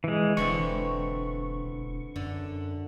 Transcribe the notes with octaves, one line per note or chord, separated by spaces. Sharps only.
E3 G#3
E1 D3 E3 C4 C#6
E1
F#2 D3